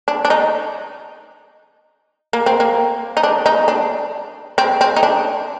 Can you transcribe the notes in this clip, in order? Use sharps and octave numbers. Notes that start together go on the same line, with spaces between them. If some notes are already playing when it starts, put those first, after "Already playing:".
D4
D4
D#4
A#3
C4
A#3
D#4
D4
D#4
D4
C4
C4
D#4
D4